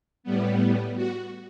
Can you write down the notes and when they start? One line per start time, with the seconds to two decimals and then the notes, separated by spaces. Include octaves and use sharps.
0.23 A2 G3 B3
0.96 F#4